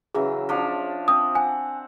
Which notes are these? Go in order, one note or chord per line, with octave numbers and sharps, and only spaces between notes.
C#3 E3 F#3 G#4
F3 D4 C#5
C4 D#6
F#5 G#5